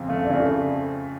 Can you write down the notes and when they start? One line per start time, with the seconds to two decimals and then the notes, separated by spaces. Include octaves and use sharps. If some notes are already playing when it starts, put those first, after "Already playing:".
Already playing: F2 C#3 F3
0.09 A3 F5
0.25 D5
0.30 C#3
0.40 A4